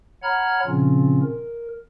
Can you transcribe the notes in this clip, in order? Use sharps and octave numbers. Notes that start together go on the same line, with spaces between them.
C#5 F#5 A#5 B5 F6 G#6
A#2 C#3 F3 C4 C#4 F4
A#4